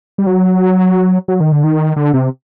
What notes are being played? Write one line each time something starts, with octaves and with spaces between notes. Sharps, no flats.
G3
F#3
F#3
D#3
D3
D#3
D3
C3